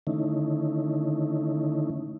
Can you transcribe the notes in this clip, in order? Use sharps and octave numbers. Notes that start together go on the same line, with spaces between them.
D3 D#3 A3 C#4 D#4 E4